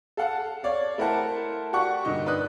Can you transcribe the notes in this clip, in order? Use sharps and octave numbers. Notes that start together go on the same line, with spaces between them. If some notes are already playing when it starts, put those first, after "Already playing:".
A4 F5 F#5 A5
C#5 D5 F5
A3 E4 A#4 C5 F#5 A5
F#4 G4 D5 F#5 C#6
G2 A#2 D3 D#4
B4 D5 B5 D#6 F#6